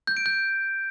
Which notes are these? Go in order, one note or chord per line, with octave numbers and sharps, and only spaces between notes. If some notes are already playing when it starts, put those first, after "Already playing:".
G6
D7
G6